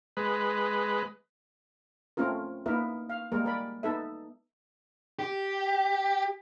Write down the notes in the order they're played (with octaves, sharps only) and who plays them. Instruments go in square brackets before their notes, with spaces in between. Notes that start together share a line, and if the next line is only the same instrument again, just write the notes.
[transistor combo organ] G#3 B4
[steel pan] A3 C4 C#4 F4 A#4
A#3 B3 D#4 E4 A#4 E5
F5
G3 G#3 A#3 A#4
A#4 D5 B5
B3 D#4 A4 E5
[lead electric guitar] G4